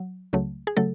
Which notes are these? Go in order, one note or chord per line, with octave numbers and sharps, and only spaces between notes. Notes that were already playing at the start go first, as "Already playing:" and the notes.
Already playing: F#3
C#2 C#3 F#3 A3
G#4
C#3 F#3 A3 A4